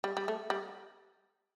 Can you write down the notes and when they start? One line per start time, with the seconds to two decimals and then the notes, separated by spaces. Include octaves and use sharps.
0.04 G3
0.17 G3
0.28 A3
0.50 G3